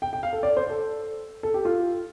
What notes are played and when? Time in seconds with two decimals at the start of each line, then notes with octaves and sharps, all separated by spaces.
0.02 G5
0.13 G5
0.23 F5
0.33 A4
0.43 D5
0.57 C5
0.70 A4
1.43 A4
1.54 G4
1.65 F4